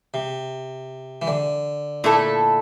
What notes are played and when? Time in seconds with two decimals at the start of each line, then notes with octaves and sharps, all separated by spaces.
0.14 C3
1.22 E3
1.27 D3
2.04 A#2 A3 E4 A4